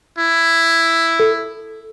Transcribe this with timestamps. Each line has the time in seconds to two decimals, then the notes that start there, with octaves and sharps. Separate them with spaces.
0.18 E4
1.20 A4